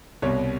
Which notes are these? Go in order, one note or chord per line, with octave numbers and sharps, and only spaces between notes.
C2 B2 G3 C#5